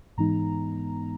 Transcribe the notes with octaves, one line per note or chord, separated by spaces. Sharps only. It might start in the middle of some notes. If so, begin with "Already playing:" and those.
G#2 E3 G#3 B3 D#4 A#5